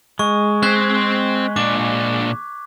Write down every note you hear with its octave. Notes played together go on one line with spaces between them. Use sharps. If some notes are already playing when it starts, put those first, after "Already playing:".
G#3 C#6
C4 C5 F#6 G#6 B6
A#2 D4 D6